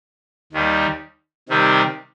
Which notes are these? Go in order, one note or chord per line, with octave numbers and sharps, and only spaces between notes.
D#2 D#3 G3
C3 D#3 G3 C4